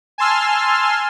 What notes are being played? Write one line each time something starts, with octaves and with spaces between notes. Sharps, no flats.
G#5 A5 C6 E6 F6